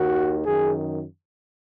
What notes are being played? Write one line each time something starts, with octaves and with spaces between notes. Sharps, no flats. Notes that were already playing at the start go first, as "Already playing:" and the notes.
Already playing: D#2 D#3 F#4
F#2 D#3 G#4